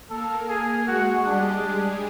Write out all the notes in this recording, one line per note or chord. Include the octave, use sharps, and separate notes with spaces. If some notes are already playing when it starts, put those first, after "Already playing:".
A#3 A4 A#4
G#4
G#3 F#4 G#4
G3 D4 G4